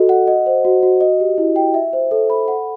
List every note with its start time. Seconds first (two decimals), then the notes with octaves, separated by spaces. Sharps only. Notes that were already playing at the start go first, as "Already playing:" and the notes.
Already playing: F#4 A4 D#5
0.09 F#5
0.27 D#5
0.46 C5
0.65 F#4
0.83 F#4
1.01 D#5
1.20 G4
1.38 E4
1.56 G5
1.74 E5
1.93 C5
2.11 A4
2.30 B5
2.48 F#5